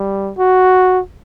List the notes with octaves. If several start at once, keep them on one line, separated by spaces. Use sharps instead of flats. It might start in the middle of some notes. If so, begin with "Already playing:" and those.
Already playing: G3
F#4